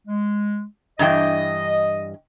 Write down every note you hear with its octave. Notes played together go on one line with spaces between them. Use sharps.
G#3
G2 E3 D#5 G5